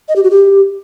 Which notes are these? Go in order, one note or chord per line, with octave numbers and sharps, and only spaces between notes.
D#5
G4
F#4
G4